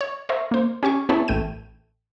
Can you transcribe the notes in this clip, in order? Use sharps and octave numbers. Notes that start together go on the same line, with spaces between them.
C#5
A#4 C5 C#5 E5
A#3 C5
C#4 G4 G#5 C#6
B3 C4 E4 G#4 C#5 A5
A1 A3 G5 D#7